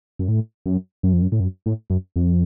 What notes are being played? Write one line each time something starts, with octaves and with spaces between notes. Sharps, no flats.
F#2
A2
F#2
F#2
F2
F#2
A2
F#2
A2
F#2
F2